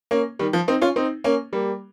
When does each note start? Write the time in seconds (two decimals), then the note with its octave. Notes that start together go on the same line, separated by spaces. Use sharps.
0.11 A#3 C#4
0.39 D#3 G3
0.53 F3
0.68 C4 D#4
0.82 C#4 F4
0.96 C4 D#4
1.24 A#3 C#4
1.53 G3 A#3